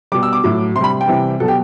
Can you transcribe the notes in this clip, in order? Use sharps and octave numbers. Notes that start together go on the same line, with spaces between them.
B2 G3 D6
E6
D6
A2 F#3
C3 C6
G3 B5
G5
C3 E3 G3
B2 F#3 A4
G4